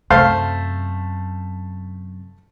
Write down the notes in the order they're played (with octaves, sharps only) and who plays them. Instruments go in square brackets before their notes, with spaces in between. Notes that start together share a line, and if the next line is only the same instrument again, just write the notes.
[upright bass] F#2 C3 [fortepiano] A3 C5 F5